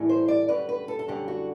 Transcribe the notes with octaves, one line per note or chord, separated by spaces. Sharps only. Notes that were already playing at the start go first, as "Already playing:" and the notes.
Already playing: A2 E3 G3
C5
D5
F#2 D3 G3 B4
B4
A4
A4
F#2 D3 G3 G4
F#4